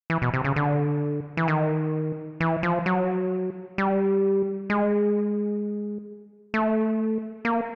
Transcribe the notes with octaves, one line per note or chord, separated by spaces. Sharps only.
E3
B2
C3
C#3
D3
E3
D#3
E3
F3
F#3
G3
G#3
A3
A#3